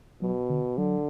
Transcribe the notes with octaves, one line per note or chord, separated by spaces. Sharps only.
B2 F#3
D3
D3 F#3